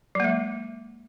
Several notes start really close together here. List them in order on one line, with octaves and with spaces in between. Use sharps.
F#3 A#3 G#3